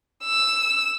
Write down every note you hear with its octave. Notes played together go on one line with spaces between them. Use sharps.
E6